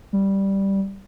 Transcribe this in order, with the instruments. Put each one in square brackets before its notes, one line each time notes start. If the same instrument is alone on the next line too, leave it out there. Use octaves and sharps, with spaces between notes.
[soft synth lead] G3